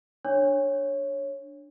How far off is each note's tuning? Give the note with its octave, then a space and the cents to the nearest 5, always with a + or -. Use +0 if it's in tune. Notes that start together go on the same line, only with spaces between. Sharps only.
D4 +0 C#5 -10